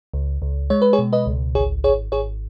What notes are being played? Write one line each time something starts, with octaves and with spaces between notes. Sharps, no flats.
C#2
C#2
G#3 C#5
B4
G#4 C#5
B2
B4 D#5
C#2
G#1 G#4 C#5
G#1 G#4 C#5
G#1 G#4 C#5